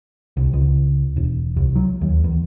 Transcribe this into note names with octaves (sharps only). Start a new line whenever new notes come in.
C2
C#2
E1
C2
F#3
D#2
E2